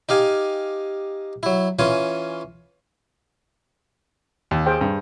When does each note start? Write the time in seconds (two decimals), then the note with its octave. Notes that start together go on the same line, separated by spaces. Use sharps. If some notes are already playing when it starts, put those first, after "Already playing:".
0.09 D#4 G4 F5 G#5
1.43 F#3 E4
1.79 E3 C#4 F4 G#5 D#6
4.51 D#2
4.66 G#4 C5 G5
4.81 G2